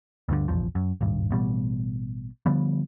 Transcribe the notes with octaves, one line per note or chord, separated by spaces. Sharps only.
D2 G2 A#2 D3
F1 A#1 E2 F3
F#2
D#1 G#1 G2
A1 B2 G3
D3 F3 G3 B3